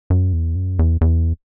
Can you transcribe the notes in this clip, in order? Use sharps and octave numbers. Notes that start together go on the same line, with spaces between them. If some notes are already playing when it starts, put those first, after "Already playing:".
F#2
E2
F#2
E2
E2